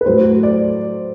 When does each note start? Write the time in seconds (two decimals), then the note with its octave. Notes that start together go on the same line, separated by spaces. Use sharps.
0.01 B4
0.06 A2 F#3 A3 C5
0.43 D5